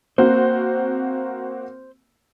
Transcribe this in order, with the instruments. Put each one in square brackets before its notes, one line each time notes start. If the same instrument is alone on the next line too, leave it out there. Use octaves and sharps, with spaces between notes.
[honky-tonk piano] A#3 C4 F#4 [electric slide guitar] C5